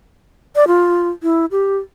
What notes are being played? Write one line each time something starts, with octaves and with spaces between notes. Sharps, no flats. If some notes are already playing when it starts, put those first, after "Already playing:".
D5
F4
E4
G4